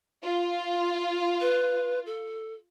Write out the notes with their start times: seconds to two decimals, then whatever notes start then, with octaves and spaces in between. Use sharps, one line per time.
0.24 F4
1.41 B4
2.06 A4